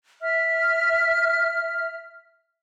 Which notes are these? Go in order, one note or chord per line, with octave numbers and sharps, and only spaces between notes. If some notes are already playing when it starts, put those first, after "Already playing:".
E5 F6